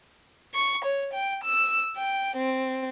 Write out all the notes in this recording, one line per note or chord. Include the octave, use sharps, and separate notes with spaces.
C#6
C#5
G5
E6
G5
C4